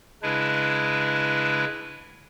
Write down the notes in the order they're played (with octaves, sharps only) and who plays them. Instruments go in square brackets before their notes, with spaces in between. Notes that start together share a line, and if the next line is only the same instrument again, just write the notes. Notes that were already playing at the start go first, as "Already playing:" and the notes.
[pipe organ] C#3 G#3 D4 E4 B4